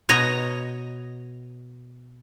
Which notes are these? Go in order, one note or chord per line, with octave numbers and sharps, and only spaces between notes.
B2 C#5 D#5 A#5